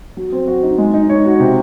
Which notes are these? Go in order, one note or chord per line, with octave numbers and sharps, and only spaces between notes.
F#3
C4
F#4
D#4
G#3
D#4
C#5
F#4
C3